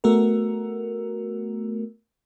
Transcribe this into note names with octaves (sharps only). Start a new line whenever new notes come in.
A3 B3 F#4 A#4